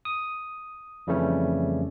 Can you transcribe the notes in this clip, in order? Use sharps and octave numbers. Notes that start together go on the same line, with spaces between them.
D#6
F2 C#3 E3 G3 A3 C#4